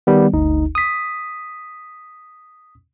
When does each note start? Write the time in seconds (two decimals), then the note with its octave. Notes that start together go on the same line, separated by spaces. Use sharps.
0.07 D#3 G3 B3
0.33 G1 D2 D#4
0.75 D#6 B6